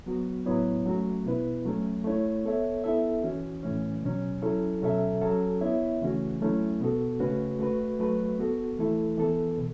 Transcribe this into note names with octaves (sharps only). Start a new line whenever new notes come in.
F#3 B3 F#4
A2 F#3 B3 E4 C#5
F#3 A3 C#4 F#4
B2 B3 E4 B4
F#3 A3 C#4
A3 E4 C#5
B3 A4 C#5 E5
B3 E4 A4 E5
E3 C#4 F#4
A2 E3 A3 C#4
B2 F#3 C#4
F#3 C#4 E4 A4
B2 F#3 C#4 A4 E5
F#3 C#4 F#4 A4
B3 E4 C#5 E5
C#3 E3 A3 C#4 F#4
F#3 A3 C#4 E4
B2 B3 F#4 A4
C#3 A3 C#4 F#4 B4
A3 F#4 B4
F#3 A3 F#4 B4
B3 F#4 A4
E3 A3 E4 A4
E3 B3 A4
B2